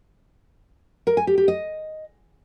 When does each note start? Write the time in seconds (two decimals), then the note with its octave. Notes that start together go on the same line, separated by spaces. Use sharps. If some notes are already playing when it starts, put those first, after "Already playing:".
1.07 A#4
1.17 G#5
1.27 G4
1.38 G4
1.48 D#5